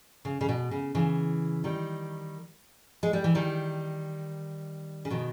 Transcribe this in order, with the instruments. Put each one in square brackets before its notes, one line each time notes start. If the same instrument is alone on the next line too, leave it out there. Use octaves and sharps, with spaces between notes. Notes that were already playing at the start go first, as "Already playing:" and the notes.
[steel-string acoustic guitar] C#3
C#3
B2
C#3
C#3 E3
D#3 G3
G#3
G3
E3
D#3 G3
C#3
B2 D#3